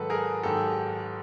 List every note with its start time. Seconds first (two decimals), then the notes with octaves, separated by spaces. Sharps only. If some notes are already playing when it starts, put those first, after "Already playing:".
Already playing: G#2 D#3 F#3 A4 B4
0.10 G#4 A#4
0.43 G#2 D#3 F#3 G4 A4